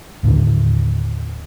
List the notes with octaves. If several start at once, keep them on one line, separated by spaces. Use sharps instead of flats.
D#2 A2 D3 A3